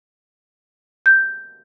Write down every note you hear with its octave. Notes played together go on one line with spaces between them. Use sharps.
G6